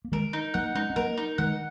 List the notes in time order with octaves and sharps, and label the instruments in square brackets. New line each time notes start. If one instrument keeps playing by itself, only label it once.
[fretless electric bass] A#3
[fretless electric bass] D#3 G#3 [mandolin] A#4
[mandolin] D#4
[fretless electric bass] F#3 A#3 [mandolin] F#5
[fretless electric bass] G#3 C#4 [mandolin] D#4
[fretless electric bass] C#4
[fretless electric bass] F#3 A#3 [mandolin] A#4
[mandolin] D#4
[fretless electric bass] D#3 G#3 [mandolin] F#5